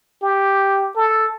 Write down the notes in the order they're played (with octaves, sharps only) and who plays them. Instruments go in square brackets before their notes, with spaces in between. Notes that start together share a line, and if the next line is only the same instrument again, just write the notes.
[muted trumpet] G4
A4